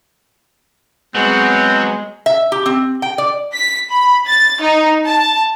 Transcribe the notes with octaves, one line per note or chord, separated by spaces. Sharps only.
F#3 G#3 B3 C4
E5
G4
C4
G5
D5
B6
B5
A6
D#4
A5